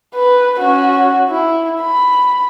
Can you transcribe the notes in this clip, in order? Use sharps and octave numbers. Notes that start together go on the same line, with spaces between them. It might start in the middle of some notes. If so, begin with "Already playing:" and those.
B4
C#4 F#4
E4
B5